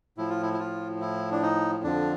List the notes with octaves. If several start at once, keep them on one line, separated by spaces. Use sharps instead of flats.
A2 F3 E4
F4
E4
E4
F4
E4
D4
D#4
F2 D3 F3 D4